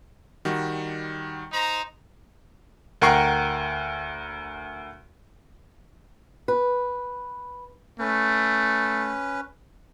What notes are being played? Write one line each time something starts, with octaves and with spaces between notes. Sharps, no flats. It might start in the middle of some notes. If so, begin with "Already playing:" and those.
D#3 G3 F#4
D#4 C5 A#5
D2 A#4 F#5 G5 C#6 C7
B4
A3 C#4 B4